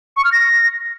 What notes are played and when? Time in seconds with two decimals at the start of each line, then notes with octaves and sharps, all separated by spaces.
0.17 C#6
0.25 F6
0.32 A#6